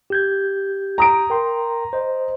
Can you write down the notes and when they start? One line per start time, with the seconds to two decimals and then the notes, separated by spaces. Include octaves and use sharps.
0.10 G4 G6 G#6
0.98 A#5 D#6 D7
1.30 A#4 G5 C6
1.93 C5 D#5